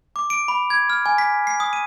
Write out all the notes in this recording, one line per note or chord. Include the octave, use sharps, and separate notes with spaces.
D6
D7
B5
G#6
F6
G#5
B6
C7
D#6
D#7